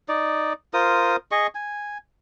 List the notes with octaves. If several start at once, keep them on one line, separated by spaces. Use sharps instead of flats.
D#4 D5
F4 A#4 C5 D#6
G#4 D#5 C#6
G#5